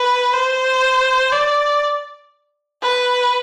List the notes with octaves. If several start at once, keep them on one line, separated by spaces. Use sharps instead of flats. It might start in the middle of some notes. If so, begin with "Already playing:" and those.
Already playing: B4
C5
D5
B4